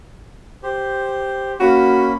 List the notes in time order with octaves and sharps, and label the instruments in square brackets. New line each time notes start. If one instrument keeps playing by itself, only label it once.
[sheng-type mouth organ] G4 C5
[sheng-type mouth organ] A#3 C#4 B5 [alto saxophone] F#4